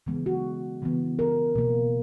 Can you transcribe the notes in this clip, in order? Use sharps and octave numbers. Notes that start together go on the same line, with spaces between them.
C#3 E3 G#3 B3
F#4
C#3 E3 B3
A#4
B2 A#3